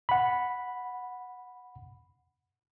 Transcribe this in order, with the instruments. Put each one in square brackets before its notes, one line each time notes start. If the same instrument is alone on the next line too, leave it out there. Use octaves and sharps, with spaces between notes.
[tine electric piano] F#5 B5